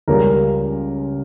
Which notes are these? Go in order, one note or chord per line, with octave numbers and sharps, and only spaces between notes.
C#2 C#3 G3 A#4